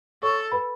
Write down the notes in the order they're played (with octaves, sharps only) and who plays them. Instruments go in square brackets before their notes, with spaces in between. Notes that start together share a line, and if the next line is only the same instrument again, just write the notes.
[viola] A4 [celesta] C#5 C#6
[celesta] B4 B5